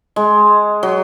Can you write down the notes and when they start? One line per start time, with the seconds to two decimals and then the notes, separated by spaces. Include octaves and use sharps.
0.16 G#3
0.83 F#3